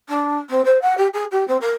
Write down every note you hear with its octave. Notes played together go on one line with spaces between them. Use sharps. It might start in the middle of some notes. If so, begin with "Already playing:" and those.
D4
C4
C5
F#5
G4
G#4
G4
C4
A#4